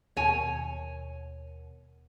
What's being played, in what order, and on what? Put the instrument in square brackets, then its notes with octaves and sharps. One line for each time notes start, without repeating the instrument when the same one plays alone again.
[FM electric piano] D#2 B2 [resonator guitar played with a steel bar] C#5 G#5